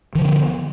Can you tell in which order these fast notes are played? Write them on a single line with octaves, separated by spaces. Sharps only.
D#3 F3 D3 B3